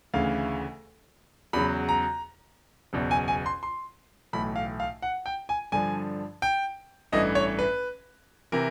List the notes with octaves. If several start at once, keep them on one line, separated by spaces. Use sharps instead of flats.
D2 C#3 E3 F5
E2 C#3 F#3 B5
A#5
F#1 E2 B2
G#5
G#5
C6
C6
B1 A2 E3 B5
F5
F5
F#5
G5
G#5
G2 D3 F3 G#5
G5
A1 G2 E3 A3 D#5
C#5
B4
C3 E3 A#4